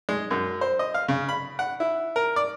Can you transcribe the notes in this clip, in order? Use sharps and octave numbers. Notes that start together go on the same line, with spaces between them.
G#3
F#2
C5
D#5
F5
C#3
B5
F#5
E4
A#4
D5